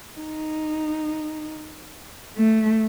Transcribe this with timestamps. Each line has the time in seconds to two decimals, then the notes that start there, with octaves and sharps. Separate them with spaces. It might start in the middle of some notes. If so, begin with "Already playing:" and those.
0.19 D#4
2.37 A3